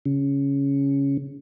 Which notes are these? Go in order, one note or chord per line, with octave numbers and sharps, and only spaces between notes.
C#3